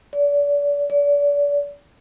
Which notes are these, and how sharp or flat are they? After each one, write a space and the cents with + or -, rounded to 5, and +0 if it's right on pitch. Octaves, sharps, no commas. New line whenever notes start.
D5 -35
D5 -35